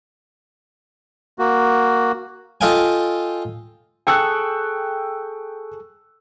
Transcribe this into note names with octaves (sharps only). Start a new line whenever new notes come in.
A#3 F#4
F4 A4 D#5 F5 G5 G#5
G#4 A4 G5 C#6 E6 F#6